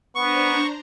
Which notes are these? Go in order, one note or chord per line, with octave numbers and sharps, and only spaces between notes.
B3 D4 C5 A#5 C#6